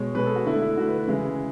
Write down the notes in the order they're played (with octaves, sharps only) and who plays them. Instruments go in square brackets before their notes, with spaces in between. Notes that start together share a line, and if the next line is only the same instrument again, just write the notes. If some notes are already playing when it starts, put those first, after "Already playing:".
Already playing: [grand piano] B2 G#3 C#5
B2 B4
G#3
A4
F#4
D3 A3 E4
E4
D3 F#4
A3
B4
B4
C#3 E3 G#3